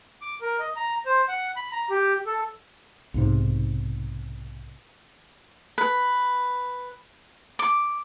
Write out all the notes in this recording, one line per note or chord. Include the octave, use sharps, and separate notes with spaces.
D6
A#4
D#5
A#5
C5
F#5
B5
A#5
G4
A4
B1 G#2 C3
B4
D6